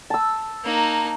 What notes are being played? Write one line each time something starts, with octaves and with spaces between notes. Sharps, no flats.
A5 E6
A#3 D#4